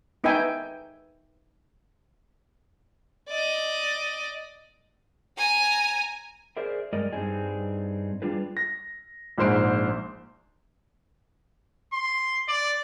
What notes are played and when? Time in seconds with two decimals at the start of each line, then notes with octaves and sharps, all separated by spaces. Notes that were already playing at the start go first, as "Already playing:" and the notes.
0.24 B3 D#4 B4 E5 G5 G#5
3.28 D5 D#5
5.37 G#5 A#5
6.57 G#4 A#4 C5 D5 E5
6.93 G2 G#3 A#4 D5 D#5
7.13 G2 G3 C4 D4 D#4 G#4
8.22 G3 D4 F4 G#4 B4
8.57 A#6
9.38 A#1 G#2 C5 C6 D7
11.93 C6
12.49 D5